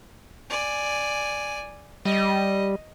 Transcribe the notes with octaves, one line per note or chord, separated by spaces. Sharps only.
D5 G#5
G3 D#5